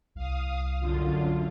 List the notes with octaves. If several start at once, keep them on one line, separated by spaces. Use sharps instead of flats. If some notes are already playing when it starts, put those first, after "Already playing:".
C2 F5 D#6
F#2 D3 F4